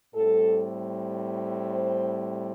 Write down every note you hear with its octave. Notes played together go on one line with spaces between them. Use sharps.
A2 G3 C4 A4
C5